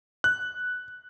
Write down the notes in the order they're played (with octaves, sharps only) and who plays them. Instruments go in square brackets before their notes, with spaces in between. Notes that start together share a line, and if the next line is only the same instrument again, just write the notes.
[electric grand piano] F#6